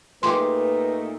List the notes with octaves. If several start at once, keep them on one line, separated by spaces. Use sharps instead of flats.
A#2 A3 D#4 G4 G#4 B4 C6